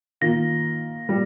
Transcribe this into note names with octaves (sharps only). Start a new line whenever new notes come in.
D#3 A#3 F4 A#6
A#2 G3